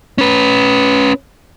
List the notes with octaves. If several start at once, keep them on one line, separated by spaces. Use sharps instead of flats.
C#4 B4